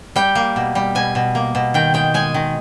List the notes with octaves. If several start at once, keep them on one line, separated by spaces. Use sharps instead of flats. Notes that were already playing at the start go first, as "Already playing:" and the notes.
G3 G5
A#3
B2
G3
B2 G#5
B2
A#3
B2
D#3 G5
G#3 G5
G#3 G#5
D#3